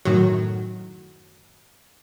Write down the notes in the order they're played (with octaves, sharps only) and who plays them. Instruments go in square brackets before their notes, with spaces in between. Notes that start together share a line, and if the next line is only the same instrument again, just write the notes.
[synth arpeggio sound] F#2 A2 D#3 F#3